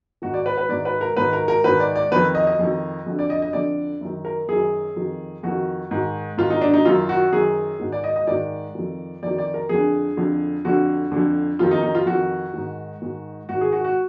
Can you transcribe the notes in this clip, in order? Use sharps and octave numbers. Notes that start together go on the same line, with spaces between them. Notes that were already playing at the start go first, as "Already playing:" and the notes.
G#2 D#3 F#4
D5
B4
B4
G#2 D#3 D5
B4
A#4
G#2 D#3 B4
A#4
A#4
G#2 D#3 B4
D5
D5
F2 D#3 B4
D#5
D#5
F2 D#3
F2 D3
D5
D#5
D#5
F2 D3 D5
F#2 D#3
A#4
F#2 D#3 G#4
F2 D#3
F2 D#3 F#4
G#2 D#3
G#2 D#3 F4
D#4
D4
D#4
F#2 D#3 F4
F#4
F#2 D#3 G#4
G#2 D#3
D5
D#5
D#5
G#2 D#3 D5
F2 D#3
F2 D#3 D5
D5
A#4
F2 D3 G#4
F2 D3
F2 D3 F#4
F2 D3
F2 D#3 F4
D#4
D#4
F4
F2 D#3 F#4
G#2 D#3
G#2 D#3
G#2 D#3 F#4
G#4
F#4
F#4